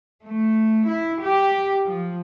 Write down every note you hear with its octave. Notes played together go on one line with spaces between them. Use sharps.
A3
E4
G4
F3